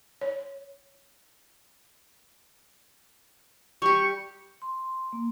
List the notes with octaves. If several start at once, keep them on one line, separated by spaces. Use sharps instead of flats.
C#5
G3 G4 C#6
C6
A#3